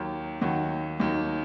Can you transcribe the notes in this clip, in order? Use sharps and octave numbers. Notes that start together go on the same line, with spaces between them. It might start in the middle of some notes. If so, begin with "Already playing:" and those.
Already playing: D#2 D#3 F#3
D#2 D#3 F#3 F#4
D#2 D#3 F#3